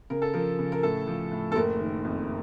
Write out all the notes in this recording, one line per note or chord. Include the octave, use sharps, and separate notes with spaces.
C#3 A#4
A4
F3 A#4
C#3
A#4
A2 A4
F3
A2
A4
F#1 A#4
D#3
F2